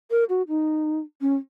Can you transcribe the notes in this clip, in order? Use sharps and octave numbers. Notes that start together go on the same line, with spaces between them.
A#4
F#4
D#4
C#4